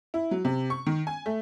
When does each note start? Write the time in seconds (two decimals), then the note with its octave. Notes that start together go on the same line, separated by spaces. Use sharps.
0.14 E4
0.31 F#3
0.45 C3
0.70 C#6
0.86 D#3
1.07 G#5
1.26 A3